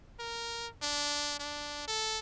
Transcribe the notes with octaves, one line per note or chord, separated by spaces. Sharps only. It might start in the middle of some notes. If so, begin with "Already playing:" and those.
A#4
D4
D4
A4